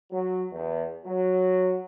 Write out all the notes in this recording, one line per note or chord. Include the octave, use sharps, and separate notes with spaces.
F#3
E2
F#3